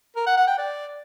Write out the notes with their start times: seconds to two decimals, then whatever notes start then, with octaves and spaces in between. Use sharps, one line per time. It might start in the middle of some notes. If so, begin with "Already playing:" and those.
0.16 A#4
0.26 F#5
0.37 F#5
0.47 G5
0.58 D5